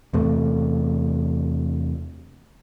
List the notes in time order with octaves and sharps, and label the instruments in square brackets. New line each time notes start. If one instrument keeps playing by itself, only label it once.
[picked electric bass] E2 C3 A3